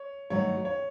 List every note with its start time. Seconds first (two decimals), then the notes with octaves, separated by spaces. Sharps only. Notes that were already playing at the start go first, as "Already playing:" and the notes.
Already playing: C#5
0.30 G2 D#3 F#3 A3 C#5
0.65 C#5